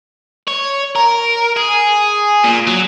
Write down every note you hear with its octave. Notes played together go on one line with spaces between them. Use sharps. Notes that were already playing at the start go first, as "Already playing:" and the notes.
C#5
A#4
G#4
A#2
F#3